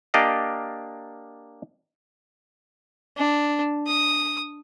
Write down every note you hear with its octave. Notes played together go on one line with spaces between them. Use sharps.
A#3 D4 G4 D5 D#5 F5
D4
D#6